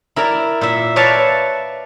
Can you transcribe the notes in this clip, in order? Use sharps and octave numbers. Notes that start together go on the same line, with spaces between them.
E4 A#4 D5 A#5
A#2 E5
B4 C#5 D5 E5 F5 A5